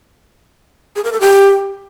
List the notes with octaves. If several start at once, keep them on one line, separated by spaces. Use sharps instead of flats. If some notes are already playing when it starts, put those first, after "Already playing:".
G#4
A#4
A4
G4